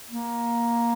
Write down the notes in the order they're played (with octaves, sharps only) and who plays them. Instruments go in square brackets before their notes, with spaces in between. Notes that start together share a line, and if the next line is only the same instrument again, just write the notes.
[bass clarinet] A#3